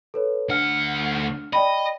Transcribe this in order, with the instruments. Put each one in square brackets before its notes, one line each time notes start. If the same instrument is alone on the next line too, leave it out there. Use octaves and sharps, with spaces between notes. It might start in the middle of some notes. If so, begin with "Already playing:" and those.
[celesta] A4 B4 C#5
[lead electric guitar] D2 F#5 [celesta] D4 F6
[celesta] D5 G5 B5 [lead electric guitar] D#5